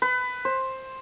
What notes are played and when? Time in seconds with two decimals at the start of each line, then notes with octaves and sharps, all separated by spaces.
0.02 B4
0.45 C5